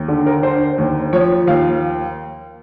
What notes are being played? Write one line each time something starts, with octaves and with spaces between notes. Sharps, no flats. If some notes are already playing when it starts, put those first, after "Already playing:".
Already playing: D#2
D3
A#4
D3 C5
D#2
F3 C#5
D#2 F5